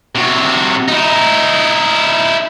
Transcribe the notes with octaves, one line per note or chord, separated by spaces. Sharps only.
C3 F#4
D#4 E4